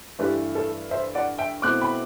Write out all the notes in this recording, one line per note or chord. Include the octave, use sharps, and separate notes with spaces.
G2 E3 A3 G4 B4
A4
C5 E5
D5 F#5
E5 G5
B2 A3 C4 E4 D6 F#6
G5 B5